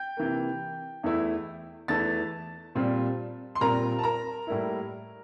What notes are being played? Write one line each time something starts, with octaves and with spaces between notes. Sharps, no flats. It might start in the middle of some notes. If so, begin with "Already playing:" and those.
Already playing: G5 G6
C3 E3 A#3
E2 E3 A3 E4
E2 E3 A3 E4 A5 A6
A#2 G3 C4 F4
C6
A#2 G3 C4 F4 A#4 A#5
A5
A#4 A#5
A2 G3 A#3 E4